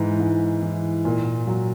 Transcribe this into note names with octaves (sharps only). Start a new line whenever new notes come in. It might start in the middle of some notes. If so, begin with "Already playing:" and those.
Already playing: G#2 E3
G#2
E3
A#2
F#3